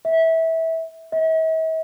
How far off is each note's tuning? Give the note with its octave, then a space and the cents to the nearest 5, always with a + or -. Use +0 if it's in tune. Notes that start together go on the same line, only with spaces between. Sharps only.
E5 -20
E5 -45